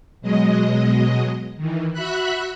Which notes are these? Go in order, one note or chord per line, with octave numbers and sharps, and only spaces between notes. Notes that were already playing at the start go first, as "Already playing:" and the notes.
B2 F#3 G#3 D#5
D#3 E3
F#4 E5 B5 F#6